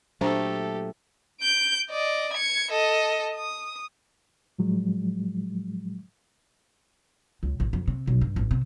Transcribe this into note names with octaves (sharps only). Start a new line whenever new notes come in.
A#2 F#3 A3 D4 G4 A4 C5 A#5
G6 D7
D5 D#5
G#6 C#7
A4 D#5
D#6
A2 F3 F#3 G#3
C#2
A1
F2
C3
B1
G2
A1
C3